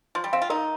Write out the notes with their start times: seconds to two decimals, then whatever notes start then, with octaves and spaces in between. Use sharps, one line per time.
0.15 F3 C6
0.24 G3
0.33 C4 F5
0.42 F4
0.50 D#4 A#4